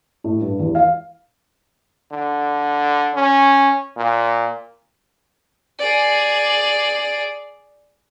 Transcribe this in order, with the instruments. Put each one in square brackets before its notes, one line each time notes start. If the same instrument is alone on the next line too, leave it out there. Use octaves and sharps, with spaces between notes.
[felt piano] A2
G2
E2
F5
[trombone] D3
C#4
A#2
[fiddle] G#4 D5